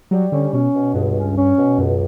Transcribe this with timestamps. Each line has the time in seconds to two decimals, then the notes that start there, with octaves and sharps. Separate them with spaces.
0.11 F#3 G3
0.32 D3 C#4
0.53 B2 C#4
0.74 B2
0.94 C#2 G2
1.16 C#4
1.37 C#4
1.57 B2
1.78 C#2 F#2